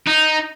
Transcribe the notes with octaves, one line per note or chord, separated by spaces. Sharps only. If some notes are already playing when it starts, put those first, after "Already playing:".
D#4